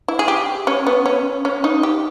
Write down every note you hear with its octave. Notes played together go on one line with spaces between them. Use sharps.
E4
G#4
G4
C#4
B3
C#4
C#4
D#4
G4